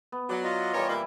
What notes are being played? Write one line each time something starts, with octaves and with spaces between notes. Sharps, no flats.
B3
F#3 D5 F#5 A#5
F4 D#5
E3 G3 A#4 C#5
A#2 A#3 E4